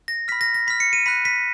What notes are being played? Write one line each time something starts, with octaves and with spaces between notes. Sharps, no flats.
A#6
B5 F6 B6
A#6
A#6
B5 F6 B6
C#7
D#7
B5 F#6 B6
B6